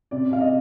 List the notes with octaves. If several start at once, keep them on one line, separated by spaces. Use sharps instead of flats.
C3 D5
C3 F5
D#5